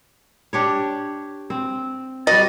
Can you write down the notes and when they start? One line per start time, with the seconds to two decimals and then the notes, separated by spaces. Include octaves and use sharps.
0.53 D4 G4 C#5
1.50 C4
2.27 G3 F#4 D#5 A6